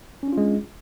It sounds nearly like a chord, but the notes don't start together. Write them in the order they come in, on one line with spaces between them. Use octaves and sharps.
C#4 D4 F4 G#3